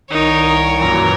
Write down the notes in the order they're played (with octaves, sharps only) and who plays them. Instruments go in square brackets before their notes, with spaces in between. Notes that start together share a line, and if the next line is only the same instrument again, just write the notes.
[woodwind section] C2 D#3 [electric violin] D#4 [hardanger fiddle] A#4 C#5
[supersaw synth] F#2 A#2 E3 [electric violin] A#5